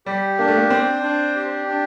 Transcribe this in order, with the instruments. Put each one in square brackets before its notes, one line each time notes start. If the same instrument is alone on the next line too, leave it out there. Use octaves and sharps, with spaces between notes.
[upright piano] G3 [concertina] G4
[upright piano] A#3 [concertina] D4
[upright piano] A3
A#3
[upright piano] C4 [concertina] C5
[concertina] D4
G4
D4